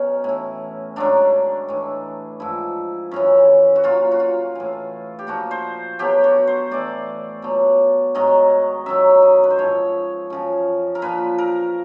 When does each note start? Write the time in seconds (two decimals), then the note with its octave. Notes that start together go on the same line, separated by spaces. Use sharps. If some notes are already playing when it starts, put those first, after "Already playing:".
Already playing: B2 F#3 C#4 D#4
0.24 A2 E3
0.96 G#2 D#3 F#3 D4
1.69 A2 E3
2.40 G#2 F3 E4
3.11 F#2 C#3 E3
3.76 F#4
3.84 A#2 F#3 F4
4.12 F#4
4.20 F4
4.55 A2 E3
5.19 G4
5.27 A#2 F3 F#4
5.51 C5
5.99 B2 F#3 G4
6.24 F#4
6.47 C5
6.71 A2 E3 D5
7.42 B2 F#3
8.15 G#2 D#3 F#3 D#5
8.86 F#2 D#3 F#3 E5
9.22 D#5
9.44 B4
9.50 C5
9.58 G#2 F3 C#5
10.30 F#2 C#3 F3
10.95 A#4
11.02 A#2 F3 B4
11.38 A#4